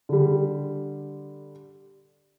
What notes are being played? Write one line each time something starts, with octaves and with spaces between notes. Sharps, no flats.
D3 G3